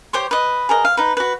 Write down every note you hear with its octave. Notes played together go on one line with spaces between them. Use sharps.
G4 C5 C#5 C6
B4 D#5
G#4 A#4 D#5
F5
D#4 B4
F#4 B4